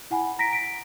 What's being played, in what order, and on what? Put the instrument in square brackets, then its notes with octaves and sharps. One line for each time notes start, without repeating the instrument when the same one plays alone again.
[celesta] E4 F#5 G#5 B5
A#5 A#6 B6 D7
B6 D7